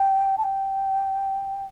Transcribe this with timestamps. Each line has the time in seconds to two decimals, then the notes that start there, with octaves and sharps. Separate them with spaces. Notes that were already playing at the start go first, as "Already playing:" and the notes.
Already playing: G5
0.37 A5
0.43 G5